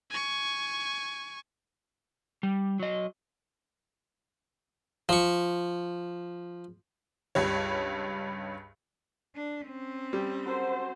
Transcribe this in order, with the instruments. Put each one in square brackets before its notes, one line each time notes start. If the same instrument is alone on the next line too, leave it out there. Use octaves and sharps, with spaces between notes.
[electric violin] G#5 C#6
[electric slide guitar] G3
F#3 D#5
[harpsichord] F3 C#6
[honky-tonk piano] C#2 G2 G3 C#5
[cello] D4
C4 C#4
[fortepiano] G3
[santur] F#3 A4 A#4 [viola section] C5